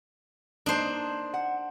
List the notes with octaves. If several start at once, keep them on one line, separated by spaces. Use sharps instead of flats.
A#3 D4 D#4 C5
F#5